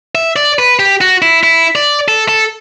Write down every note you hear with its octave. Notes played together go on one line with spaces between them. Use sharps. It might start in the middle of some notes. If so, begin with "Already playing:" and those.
E5
D5
B4
G4
F#4
E4
E4
D5
A4
A4